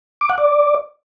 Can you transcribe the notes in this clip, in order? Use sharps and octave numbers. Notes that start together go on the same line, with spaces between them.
D6
F#5
D5